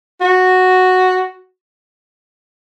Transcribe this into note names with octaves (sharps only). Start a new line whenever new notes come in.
F#4